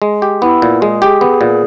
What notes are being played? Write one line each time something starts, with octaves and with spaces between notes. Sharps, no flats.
G#3
G4
B3 E4
A#2
G#3 G#4
G4
B3
A#2